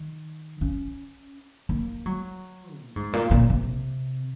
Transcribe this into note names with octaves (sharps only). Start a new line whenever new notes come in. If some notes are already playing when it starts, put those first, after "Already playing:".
Already playing: D#3
C#4
A#3
F#3
A#2
G#2
A#2
A#2
C3